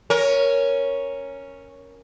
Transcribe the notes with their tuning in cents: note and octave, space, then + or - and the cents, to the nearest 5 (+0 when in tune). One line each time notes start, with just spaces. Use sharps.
C#4 +0 A#4 +5